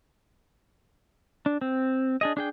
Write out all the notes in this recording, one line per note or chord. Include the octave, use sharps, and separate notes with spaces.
D4
C4
D4 G#4 D#5
D4 G#4 G5